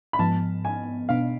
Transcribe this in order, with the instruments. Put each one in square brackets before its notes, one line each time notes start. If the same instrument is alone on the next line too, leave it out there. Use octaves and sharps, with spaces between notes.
[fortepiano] B5
[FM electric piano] G#2 F3 B3 [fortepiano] A5
[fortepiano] G#5
[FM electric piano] B2 B3 D4 [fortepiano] F5